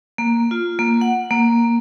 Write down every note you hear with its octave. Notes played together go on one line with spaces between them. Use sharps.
A#3
F4
A#3
F#5
A#3